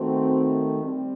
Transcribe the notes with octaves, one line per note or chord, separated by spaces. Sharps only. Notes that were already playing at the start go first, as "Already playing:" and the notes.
Already playing: D#3 A3 C4 F#4
G3 C4